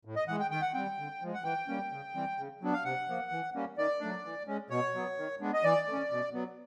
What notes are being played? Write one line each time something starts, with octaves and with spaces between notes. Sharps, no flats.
A2
D#5
E3 G#3 F#5
G5
D#3 G5
F#5
G3 C4 G5
D3
F3 G#3
F#5
E3 G5
G3 A#3 C#4
C#3
E3 G3 C4
C#3
F#3 B3 D4
F5
C3 F#5
F3 A#3
E3
G3 A#3 C#4
D#3 D5
F#3 A3 D4
E3
G#3 C#4
B2 C#5
F#3 B3
D#3
G#3 B3 D4
D#5
E3 D5
A3
C#4
B2
F#3 B3